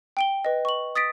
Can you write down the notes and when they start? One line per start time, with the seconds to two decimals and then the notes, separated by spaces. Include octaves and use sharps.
0.17 G5 D7 G7
0.45 B4 D#5
0.65 C#6 F#7
0.95 D#6 A6 B6 D7